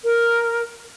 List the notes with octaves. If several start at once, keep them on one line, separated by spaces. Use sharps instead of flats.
A#4